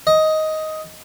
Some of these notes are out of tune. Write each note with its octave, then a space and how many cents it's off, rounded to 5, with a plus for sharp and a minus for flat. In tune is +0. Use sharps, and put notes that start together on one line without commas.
D#5 +10